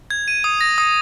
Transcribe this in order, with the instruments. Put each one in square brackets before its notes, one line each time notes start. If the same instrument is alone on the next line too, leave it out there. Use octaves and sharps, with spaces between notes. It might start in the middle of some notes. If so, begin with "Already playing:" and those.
[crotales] G#6
D#7
D#6
A#6
D#6